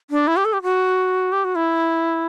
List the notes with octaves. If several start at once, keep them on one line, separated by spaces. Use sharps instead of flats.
D4
E4
G4
A4
G4
F#4
G4
F#4
E4